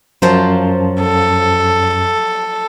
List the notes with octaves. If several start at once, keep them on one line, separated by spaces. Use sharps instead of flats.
F#2 F3 F#3 C5 A5
A4